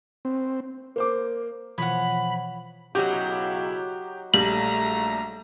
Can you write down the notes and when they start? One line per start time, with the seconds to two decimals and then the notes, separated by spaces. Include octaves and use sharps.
0.25 C4
0.96 A#3 C5 D6
1.78 B2 E3 F3 C#5 F#5 B5
2.95 B1 C#3 F#3 D#4 E4 F#4 G4
4.34 A#1 G3 A3 A#5 F#7